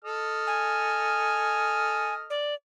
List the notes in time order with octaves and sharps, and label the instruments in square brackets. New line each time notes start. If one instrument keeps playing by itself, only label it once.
[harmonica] A4 D#5 F6
[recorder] G#5
D5